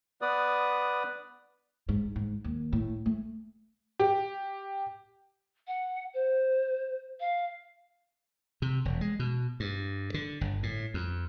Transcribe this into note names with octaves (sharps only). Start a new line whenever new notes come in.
B3 B4 D5 D#6
G#2
G#2
D#2
A2
A3
G4
F#5
C5
F5
C3
E1
G#3
B2
G2
D3
G1
A2
F2